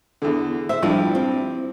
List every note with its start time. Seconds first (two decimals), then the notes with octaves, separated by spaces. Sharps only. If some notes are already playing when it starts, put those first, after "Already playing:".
0.22 E2 D3
0.69 C5 E5
0.83 G2 F3 G3 E4
1.15 C4